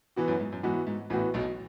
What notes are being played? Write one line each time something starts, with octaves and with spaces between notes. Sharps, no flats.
E3 B3 F#4
F#2 F#3
G#2
F#2
G#2 E3 B3 F#4
G#2
A1 A2 E3 B3 F#4
B1 B2